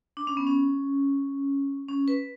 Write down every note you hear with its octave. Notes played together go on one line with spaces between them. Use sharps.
D4
C#4
B3
C#4
C#4
B4